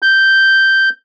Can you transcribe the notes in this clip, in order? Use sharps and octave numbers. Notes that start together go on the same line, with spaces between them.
G6